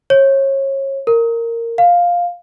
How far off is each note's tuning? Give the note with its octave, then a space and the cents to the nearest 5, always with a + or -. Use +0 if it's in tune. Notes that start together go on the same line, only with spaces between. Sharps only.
C#5 -30
A#4 -15
F5 +5